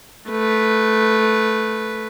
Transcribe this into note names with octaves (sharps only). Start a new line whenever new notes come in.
A3 B4